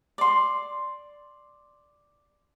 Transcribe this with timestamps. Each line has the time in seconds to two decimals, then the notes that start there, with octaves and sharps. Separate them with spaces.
0.18 D5 C6